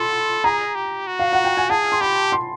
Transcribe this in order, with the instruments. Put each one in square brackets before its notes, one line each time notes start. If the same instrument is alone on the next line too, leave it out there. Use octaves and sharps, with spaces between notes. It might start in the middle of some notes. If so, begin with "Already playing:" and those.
Already playing: [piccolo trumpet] A4 [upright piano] B5 C6
[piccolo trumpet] G#4 [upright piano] A#5
[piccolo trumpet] G4
F#4
[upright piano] F5
F#5
G5
G#5
[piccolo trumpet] G#4 [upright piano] A5
[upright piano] C6
[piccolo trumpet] G4 [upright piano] B5
[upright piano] C6